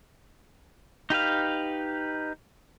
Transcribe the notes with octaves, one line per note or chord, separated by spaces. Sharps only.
D#4 G4 B4 F5